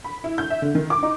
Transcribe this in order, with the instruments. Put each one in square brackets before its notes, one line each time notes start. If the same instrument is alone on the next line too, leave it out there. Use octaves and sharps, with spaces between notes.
[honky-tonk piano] B5
E4
G6
E5
D3
D#3
D6
D#4